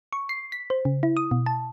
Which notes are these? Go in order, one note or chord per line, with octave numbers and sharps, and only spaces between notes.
C#6
C7
B6
C5
C#3
E4
D#6
B2
A5